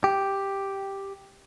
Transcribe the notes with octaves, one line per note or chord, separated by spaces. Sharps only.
G4